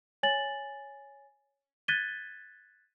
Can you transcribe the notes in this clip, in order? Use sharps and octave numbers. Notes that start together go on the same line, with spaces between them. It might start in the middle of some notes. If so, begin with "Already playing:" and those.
C#5 G#5 A6 F#7
F#6 G#6 A6 B6 D#7 G7